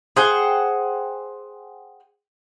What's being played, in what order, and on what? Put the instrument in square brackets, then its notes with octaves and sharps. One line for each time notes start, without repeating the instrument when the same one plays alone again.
[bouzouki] G#4 C5 F#5 G5